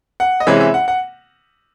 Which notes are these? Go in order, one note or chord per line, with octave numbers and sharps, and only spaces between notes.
F#5
D#5
C3 E3 G#3 C#4 E5
E5
F#5
F#5